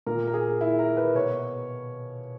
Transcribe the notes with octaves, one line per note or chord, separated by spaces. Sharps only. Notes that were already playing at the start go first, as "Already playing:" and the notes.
A#2 A#4
A#4
G#4
E4
A#4
B4
B2 C#5